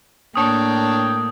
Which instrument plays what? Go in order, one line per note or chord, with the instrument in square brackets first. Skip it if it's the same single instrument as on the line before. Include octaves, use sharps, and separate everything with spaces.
[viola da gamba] A2 A#3 [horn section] D4 C#5 G5 [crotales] D#6